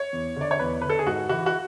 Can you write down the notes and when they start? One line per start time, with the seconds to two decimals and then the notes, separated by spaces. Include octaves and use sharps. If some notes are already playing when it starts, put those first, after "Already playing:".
Already playing: C#5
0.13 E2
0.36 D3 D5
0.51 C#5
0.59 E2 B4
0.82 D3 B4
0.89 A4
0.99 G#4
1.06 G#2 F#4
1.29 E3 F#4
1.46 F#4